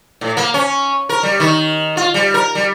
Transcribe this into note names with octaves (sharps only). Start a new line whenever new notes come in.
A2
A#3
C#4
A#4
G3
D#3
F4
G3
A#4
G3